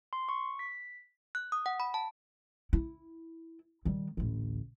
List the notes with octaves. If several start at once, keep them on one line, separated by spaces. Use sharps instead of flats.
C6
C#6
B6
F#6
D#6
F#5
B5
A5
E4
D#3 G3
A1 D2